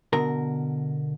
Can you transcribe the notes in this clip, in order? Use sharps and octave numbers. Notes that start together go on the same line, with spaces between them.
B2 D3 A#4